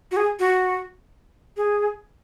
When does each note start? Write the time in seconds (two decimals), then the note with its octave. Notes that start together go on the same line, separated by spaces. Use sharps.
0.11 F#4
0.17 G#4
0.39 F#4
1.57 G#4